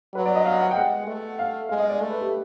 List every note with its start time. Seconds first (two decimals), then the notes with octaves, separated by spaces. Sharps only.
0.14 F#3 B4
0.26 D5
0.36 D#5
0.45 F5
0.61 F#5
0.71 G5
0.76 G#3 F#5
1.07 A3
1.39 F5
1.69 G#3 F5
1.80 D#5
1.90 D5
2.01 A3
2.10 B4
2.21 G4